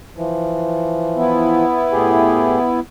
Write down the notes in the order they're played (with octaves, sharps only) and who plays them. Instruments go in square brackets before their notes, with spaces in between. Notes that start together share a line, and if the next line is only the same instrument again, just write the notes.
[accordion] E3 F3
[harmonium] B3 E4
[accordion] A2 G4 G#4